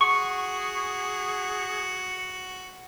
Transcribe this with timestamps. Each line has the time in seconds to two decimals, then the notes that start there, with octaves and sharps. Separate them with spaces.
0.01 F#4 G#4 C#6